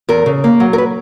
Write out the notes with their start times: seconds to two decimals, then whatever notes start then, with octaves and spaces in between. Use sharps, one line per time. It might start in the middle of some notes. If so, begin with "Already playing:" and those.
0.09 E2 A#4
0.26 C#3
0.44 A#3
0.60 F#3
0.73 A#4
0.78 B4